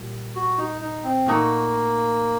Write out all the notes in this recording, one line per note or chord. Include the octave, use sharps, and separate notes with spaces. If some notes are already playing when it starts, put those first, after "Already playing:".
Already playing: A#2 G3
F#4
D#4
D#4
C4
A#2 A3 A#3 D#4 F#4